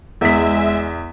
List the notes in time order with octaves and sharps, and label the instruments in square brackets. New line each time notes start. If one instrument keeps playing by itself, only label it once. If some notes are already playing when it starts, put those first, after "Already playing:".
[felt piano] E2 B6 [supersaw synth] G#3 E5